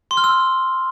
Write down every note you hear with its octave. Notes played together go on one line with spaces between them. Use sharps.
C6
F6
E6